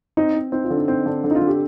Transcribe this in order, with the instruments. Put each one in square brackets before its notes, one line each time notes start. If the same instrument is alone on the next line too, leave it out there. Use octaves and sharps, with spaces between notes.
[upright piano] C4 [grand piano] D#4
[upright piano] C4
[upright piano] C4 [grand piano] D#4
[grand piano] F4
[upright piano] D3
[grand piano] D#4
[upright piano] C4 [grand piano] D#4
[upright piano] D3 [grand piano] D4
[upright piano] D3
[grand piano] D#4
F4
[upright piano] D3
[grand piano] G4